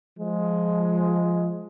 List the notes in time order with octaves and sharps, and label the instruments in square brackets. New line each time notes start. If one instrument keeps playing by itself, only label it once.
[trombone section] F3 G#3